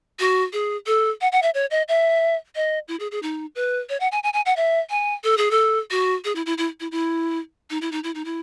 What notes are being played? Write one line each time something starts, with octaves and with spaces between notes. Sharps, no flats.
F#4
G#4
A4
F#5
F#5
E5
C#5
D#5
E5
D#5
E4
G#4
G#4
D#4
B4
C#5
F#5
G#5
G#5
G#5
F#5
E5
G#5
A4
G#4
A4
F#4
G#4
E4
E4
E4
E4
E4
D#4
E4
D#4
E4
D#4
E4